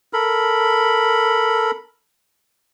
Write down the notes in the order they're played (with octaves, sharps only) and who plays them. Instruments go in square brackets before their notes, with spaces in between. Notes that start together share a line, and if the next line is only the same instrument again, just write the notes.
[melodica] A4 A#4 B5